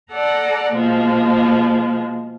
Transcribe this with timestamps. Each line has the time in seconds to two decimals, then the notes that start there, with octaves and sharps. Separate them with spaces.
0.12 A4 D5 F#5 A#5
0.73 B2 F3 G#3 A#3